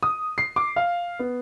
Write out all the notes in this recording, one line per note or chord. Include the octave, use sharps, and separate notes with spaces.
D#6
C7
D6
F5
B3